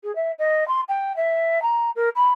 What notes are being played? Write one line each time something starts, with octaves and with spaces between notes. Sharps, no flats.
G#4
E5
D#5
C6
G5
E5
A#5
A#4
B5